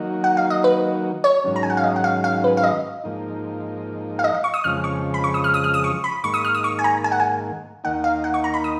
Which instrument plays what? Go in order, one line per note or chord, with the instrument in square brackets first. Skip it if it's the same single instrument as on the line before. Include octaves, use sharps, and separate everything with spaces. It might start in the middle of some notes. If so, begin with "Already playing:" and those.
Already playing: [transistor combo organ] D#3 F#3 A#3 D#4 F#4
[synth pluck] F#5
F5
D#5
B4
C#5
[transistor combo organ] G#2 D#3 F#3 C#4
[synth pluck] A#5
G#5
F#5
F5
D#5
F#5
F5
F5
B4
F5
D#5
[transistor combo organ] G#2 F3 A#3 D#4
[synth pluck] F5
D#5
F5
C#6
D#6
[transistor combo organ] F2 C#3 F3 G#3 [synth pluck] F6
[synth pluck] C#6
B5
C#6
D#6
F6
D#6
F6
D#6
C#6
B5
[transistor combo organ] G#2 D#3 A#3 [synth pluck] C#6
[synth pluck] D#6
F6
D#6
C#6
G#5
A#5
G#5
F#5
G#5
[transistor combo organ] D#2 D#3 A#3 D#4 [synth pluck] F#5
[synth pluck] F5
F#5
C#6
A#5
B5
D#6